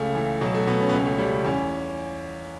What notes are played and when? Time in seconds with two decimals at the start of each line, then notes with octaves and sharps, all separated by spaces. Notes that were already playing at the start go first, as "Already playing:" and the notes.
Already playing: C#2 C#3 A3
0.15 E3
0.41 B2 F#3
0.54 A3
0.67 B2 B3
0.81 C#4
0.89 B3
0.93 C#2 C#4
1.06 A3
1.18 C#2 G3
1.45 E2 C#4